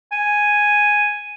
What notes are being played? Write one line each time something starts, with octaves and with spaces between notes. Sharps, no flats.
G#5